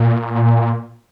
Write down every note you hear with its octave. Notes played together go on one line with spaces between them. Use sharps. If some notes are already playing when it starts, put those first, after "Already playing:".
Already playing: A#2